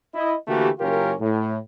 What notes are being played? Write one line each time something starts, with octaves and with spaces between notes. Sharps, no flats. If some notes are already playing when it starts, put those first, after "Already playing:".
E4 D#5
D3 E3 A3 A#3 F#4 G4
F#1 C#4 F4 G4 A#4
A2